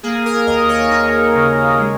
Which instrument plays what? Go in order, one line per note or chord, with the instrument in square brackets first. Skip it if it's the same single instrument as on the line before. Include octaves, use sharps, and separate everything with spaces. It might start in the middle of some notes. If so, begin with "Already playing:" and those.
[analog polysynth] A#3 G#4
A#4
D#2 D#5
C#5
D#2 C#5
C#3
G#3